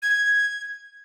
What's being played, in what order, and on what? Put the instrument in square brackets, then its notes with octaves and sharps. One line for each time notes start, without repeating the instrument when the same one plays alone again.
[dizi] G#6